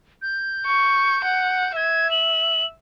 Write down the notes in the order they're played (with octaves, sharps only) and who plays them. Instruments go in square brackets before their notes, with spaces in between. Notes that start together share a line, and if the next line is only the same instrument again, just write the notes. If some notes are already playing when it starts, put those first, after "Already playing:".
[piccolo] G6
[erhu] C#6
F#5
[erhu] E5 [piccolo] G#6
[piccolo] F#7